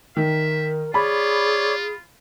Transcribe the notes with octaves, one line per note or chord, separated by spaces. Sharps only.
D#3 A#4 E5
F4 G#4 C#5 D5 B5